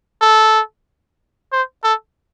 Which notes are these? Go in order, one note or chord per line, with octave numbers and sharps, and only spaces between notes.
A4
C5
A4